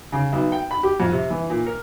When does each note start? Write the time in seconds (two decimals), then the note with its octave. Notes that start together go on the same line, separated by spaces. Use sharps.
0.12 C#3
0.32 B1
0.52 G5
0.71 B5
0.83 G4
1.00 F2
1.12 C3
1.30 E3
1.50 A#2
1.66 A#4